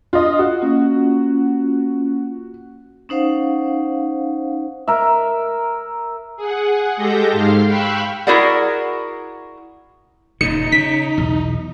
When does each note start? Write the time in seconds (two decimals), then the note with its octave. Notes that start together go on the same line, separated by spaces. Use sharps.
0.13 D4 F4 D#5
0.39 F#4
0.62 A#3 C#4 F4
3.09 C#4 D#4 C5 F5 F#5
4.87 A#4 E5
6.37 G#4 F#5
6.97 G#3 G4 A4 G6 A#6
7.32 G#2 F5 C6 F6 C7
7.64 F5 G5 B5 C#6 E6 F#6
8.27 E4 F#4 G#4 A#4 D5 F#5
10.41 D#1 A#2 C#3 D#4 C#7
10.72 C#3 B6
11.18 B1 E2